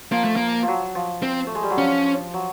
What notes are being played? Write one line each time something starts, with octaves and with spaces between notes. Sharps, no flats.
F3 A#3
A3
A#3
F3
F#3
F3
C4
A3
G#3
G3
F#3
F3 C#4
F#3